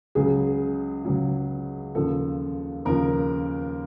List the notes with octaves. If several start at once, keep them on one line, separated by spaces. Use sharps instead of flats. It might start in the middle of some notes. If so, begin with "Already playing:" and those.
C#2 C#3 F#3 G#4
C#2 C#3 F#3
D#2 C#3 F3 A4
D#2 C#3 F3 A#4